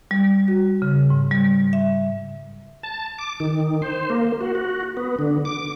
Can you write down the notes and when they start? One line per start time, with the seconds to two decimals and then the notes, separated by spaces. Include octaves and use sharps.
0.11 G3
0.48 F#4
0.82 C#3
1.10 G#2
1.31 G3
1.73 E5
2.83 A5
3.19 D6
3.40 D#3
3.82 C5
4.10 A#3
4.41 F#4
4.55 F#4
4.97 B3
5.19 D3
5.45 D6